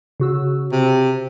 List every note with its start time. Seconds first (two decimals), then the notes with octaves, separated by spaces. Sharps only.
0.20 C#3 F#4 E6
0.72 C3